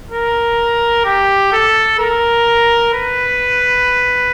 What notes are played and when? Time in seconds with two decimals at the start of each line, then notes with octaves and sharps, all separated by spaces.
0.11 A#4
1.05 G4
1.52 A4
1.99 A#4
2.93 B4